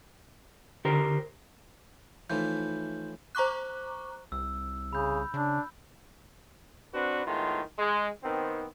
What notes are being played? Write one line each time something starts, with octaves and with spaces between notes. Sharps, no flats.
D3 G4 A#4 C5
A2 E3 F3 D#4 G6
C5 A#5 C#6 D6 F#6
C2 E6
C#3 B5 G6
C#3 D4
C4 D4 F#4 B4
A2 D#3 G#3 B3 F4
G#3
D#3 B3 C4